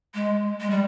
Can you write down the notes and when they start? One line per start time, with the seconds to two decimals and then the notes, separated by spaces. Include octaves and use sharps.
0.14 G#3
0.60 G#3
0.70 G3